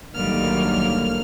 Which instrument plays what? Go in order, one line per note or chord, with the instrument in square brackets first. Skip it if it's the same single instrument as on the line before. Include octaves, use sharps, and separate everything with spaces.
[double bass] B1 F#3 [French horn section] A2 D3 A#3 [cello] D#3 G3 [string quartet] F6